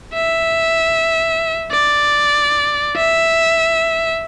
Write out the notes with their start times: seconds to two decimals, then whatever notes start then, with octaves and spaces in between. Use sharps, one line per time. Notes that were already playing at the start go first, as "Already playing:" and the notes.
0.14 E5
1.71 D5
2.97 E5